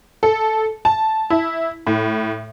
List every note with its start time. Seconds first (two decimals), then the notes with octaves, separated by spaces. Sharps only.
0.23 A4
0.85 A5
1.30 E4
1.87 A2